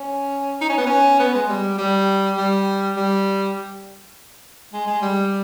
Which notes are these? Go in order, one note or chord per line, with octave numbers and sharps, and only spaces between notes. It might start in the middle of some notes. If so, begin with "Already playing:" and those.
Already playing: C#4
D#4
C#4
B3
C#4
B3
G#3
G3
G3
G3
G3
G#3
G#3
G3